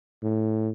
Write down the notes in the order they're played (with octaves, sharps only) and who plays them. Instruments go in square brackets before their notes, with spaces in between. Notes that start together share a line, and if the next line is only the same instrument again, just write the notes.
[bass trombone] A2